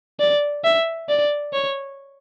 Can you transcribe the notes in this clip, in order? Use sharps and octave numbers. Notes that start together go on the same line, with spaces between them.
D5
E5
D5
C#5